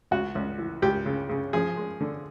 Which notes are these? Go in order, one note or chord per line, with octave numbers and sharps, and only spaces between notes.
C#2 F#4
C#2
E3
C#2 G4
C#3
C#3
F3 G#4
G#3
D3